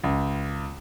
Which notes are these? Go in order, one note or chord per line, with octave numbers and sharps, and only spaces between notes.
C#2